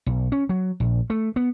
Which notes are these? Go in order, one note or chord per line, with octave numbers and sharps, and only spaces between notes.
B1
C#4
F#3
A#1
A3
B3